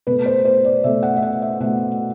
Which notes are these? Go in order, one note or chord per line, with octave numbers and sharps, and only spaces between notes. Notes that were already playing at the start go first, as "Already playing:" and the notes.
B2 A3 B4
C5
C5
D5
B2 A3 E5
F#5
E5
F#5
E5
B2 A3 F#5